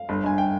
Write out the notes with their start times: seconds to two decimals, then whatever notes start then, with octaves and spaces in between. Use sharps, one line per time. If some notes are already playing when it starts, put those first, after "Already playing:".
Already playing: F5
0.09 G1
0.24 G1 G#5
0.38 G5